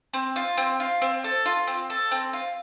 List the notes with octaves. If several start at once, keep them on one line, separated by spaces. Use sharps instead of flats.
C4
F4
C4
F4
C4
A4
F4
C4
A4
C4
F4